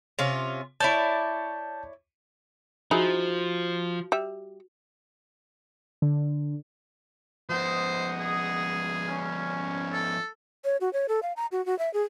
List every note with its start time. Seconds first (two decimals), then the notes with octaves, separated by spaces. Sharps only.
0.19 C3 C#4 F4
0.80 E4 C#5 D5 A5 G6
2.91 F3 D#4 E4 F#4 G#4
4.12 G3 E5
6.02 D3
7.49 F3 B3 C5 D#5 F#5 D#6
8.20 G#4
9.07 C#4
9.93 A4
10.65 C#5
10.81 F#4
10.93 C#5
11.09 A4
11.23 F5
11.37 A#5
11.52 F#4
11.66 F#4
11.79 E5
11.94 G#4